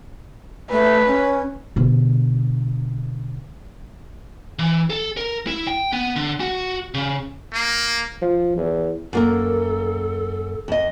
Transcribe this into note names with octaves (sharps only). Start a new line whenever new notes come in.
A3 B4
C#4
B2 D3
E3
A4
A#4
E4
G5
B3
D3
F#4
C#3
A#3
F3
E2
F#2 A#3 A4 A#4
F2 D#5